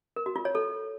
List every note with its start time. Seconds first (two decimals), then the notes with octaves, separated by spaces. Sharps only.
0.16 A#4
0.26 F#4
0.36 F4
0.45 C#5
0.55 A4